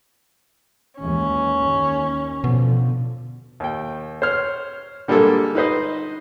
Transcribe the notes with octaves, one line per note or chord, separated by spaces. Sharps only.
D#2 E3 G#3 C#4
D#2
B2 D3 F3
D#2 G5
C5 C#5 F6
D3 G3 G#3 A#3 A4
D#4 B4 C5 D#5